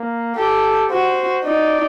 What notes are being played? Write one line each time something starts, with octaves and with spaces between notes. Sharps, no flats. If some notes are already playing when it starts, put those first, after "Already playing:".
Already playing: A#3
G4 A4
F#4 C5
D#4 D5